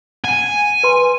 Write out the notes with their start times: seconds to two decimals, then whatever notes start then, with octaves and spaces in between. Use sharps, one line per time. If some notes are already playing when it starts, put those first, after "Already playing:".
0.24 F#5 G#5
0.83 B4 C6